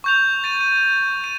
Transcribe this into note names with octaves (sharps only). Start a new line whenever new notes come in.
C#6 G6 F7
A6 D#7
D#7
D#7